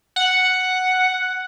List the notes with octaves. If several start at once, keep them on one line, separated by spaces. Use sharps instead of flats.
F#5